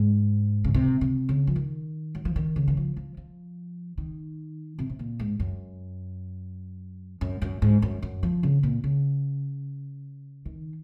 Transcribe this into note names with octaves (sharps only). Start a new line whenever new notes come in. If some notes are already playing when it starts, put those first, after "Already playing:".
Already playing: G#2
C#3
C3
C3
C#3
F3
D#3
F#3
F3
D#3
C#3
D#3
F3
F3
F3
D#3
C3
C3
A#2
G#2
F#2
F#2
F#2
G#2
F#2
F#2
F3
C#3
A#2
C#3
D#3